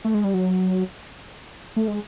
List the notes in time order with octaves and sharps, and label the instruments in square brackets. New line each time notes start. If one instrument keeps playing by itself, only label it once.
[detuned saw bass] A3
G#3
G3
F#3
A3
G#3